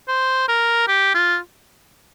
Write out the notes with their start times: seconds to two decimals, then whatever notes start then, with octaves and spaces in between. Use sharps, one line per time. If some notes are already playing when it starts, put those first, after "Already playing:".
0.08 C5
0.48 A#4
0.88 G4
1.14 F4